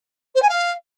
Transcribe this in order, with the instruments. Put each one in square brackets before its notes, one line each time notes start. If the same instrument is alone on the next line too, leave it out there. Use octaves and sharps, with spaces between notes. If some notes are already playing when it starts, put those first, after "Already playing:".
[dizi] C5
G#5
F5